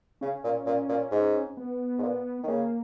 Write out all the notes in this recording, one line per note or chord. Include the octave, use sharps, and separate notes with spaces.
C#3 C#4
A#2
A#2
A#2
G#2
B3
G#2
A#2
D#3
C#3 A#3